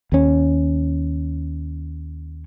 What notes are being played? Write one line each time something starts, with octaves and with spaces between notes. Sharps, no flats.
D#2 C#4